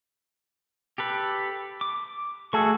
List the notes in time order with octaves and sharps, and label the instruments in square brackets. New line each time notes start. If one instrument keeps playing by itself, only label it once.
[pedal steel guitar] G4 A4 B4
D6
[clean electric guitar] A3 G#4 A4 [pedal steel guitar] F#4 C#6